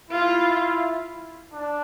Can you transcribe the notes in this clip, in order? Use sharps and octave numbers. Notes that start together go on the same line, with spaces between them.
E4 F4
D4